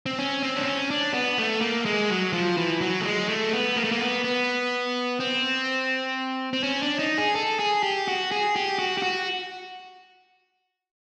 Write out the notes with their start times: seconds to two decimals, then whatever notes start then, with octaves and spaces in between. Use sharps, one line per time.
0.06 C4
0.19 C#4
0.43 C4
0.56 D4
0.65 C#4
0.90 D4
1.14 B3
1.38 A3
1.61 A#3
1.85 G#3
2.10 F#3
2.33 F3
2.57 E3
2.81 F#3
3.01 A3
3.05 G#3
3.29 A3
3.53 B3
3.77 A#3
3.84 A3
3.92 A#3
4.00 B3
4.24 B3
5.20 C4
6.53 C4
6.63 C#4
6.82 D4
6.99 D#4
7.18 G#4
7.35 A4
7.59 G#4
7.83 G4
8.08 F#4
8.31 G#4
8.56 G4
8.79 F#4
8.98 G4
9.02 F#4